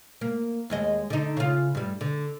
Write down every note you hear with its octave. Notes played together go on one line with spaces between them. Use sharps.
A#3
D#2 G#3 D#5
D3 D#4
C#3 F4
G2 G3
D3